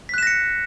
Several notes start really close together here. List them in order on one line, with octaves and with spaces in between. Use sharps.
B6 F#6 E7 A#6 C#7